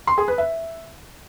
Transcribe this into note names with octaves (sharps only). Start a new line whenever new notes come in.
C6
G#4
B4
E5